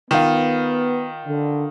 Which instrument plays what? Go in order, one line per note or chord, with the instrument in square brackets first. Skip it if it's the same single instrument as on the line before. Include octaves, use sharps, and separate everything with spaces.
[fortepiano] D#3 F4 [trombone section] B3
[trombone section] D3